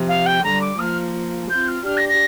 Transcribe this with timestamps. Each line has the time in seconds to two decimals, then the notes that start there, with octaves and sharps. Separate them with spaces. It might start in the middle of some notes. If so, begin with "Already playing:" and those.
Already playing: C3 F3
0.08 F5
0.26 G5
0.43 D3 G3 A#5
0.61 D6
0.78 F3 A#3 F6
1.49 C4 F4 G6
1.68 F6
1.85 D4 G4 F6
1.97 A#6
2.09 A#6